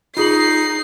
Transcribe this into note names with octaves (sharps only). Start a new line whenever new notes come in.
D#4 F4 G#4 C7 F#7